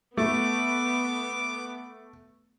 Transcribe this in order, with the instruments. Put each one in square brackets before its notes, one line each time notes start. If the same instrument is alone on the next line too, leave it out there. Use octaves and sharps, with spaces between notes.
[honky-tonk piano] A3 [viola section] B3 [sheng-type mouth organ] D6